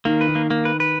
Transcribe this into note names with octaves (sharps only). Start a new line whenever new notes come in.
D#3 A#3
B4
D#3
A#3
A#3
B4
B4